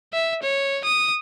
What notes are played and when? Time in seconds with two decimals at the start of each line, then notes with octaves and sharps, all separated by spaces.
0.13 E5
0.43 C#5
0.85 D#6